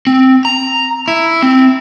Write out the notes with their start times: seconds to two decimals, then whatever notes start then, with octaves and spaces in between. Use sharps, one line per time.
0.07 C4
0.45 A#5
1.08 E4
1.42 C4